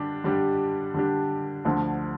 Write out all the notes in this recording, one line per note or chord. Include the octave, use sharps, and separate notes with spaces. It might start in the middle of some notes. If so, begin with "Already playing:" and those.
Already playing: D3 G3 D4 G4
D3 G3 D4 G4
D3 G3 D4 G4
D2 D3 F3